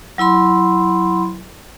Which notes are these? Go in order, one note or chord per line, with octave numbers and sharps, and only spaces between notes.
F#3 E4 B5 C6